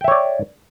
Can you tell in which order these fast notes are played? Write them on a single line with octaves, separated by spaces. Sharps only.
G5 E5 C#5 D5